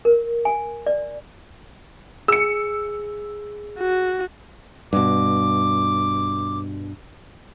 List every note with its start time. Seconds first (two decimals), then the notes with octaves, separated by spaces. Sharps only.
0.05 A#4
0.45 G#5
0.86 D5
2.28 G#4 E6 C#7
3.78 F#4
4.93 G2 B2 D6